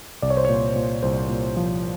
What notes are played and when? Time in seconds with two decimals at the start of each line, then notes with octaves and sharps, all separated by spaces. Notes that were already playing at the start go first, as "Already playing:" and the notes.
0.22 C2 D5
0.30 C#5
0.37 C5
0.45 A#2 C#5
0.76 A#2
1.03 C2 C5
1.29 A#2
1.57 F3